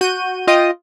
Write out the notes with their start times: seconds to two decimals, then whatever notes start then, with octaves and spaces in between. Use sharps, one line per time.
0.01 F#4 G6 D#7
0.47 F4 D#5 G5 D#6